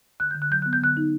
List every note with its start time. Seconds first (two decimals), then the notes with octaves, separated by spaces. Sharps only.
0.20 D3 F#6
0.31 D3 G6
0.42 F#6
0.51 F#3 G6
0.62 B3 F#6
0.73 G6
0.82 D3 F#6
0.97 D#4